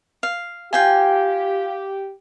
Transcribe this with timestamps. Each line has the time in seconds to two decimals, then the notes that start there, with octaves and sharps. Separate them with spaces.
0.23 F5
0.73 F4 G4 F5 G5 G#5